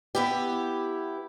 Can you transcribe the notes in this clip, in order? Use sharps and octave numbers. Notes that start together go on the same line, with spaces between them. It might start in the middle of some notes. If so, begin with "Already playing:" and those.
B3 E4 G4